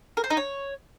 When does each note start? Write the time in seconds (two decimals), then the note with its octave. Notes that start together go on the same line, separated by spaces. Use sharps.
0.17 A#4
0.24 C5
0.30 D#4
0.37 C#5